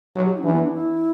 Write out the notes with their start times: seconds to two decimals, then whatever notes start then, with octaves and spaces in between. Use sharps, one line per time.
0.15 F#3
0.25 G4
0.35 E4
0.40 C#4
0.44 E3 D4
0.53 B3
0.63 D4
0.73 E4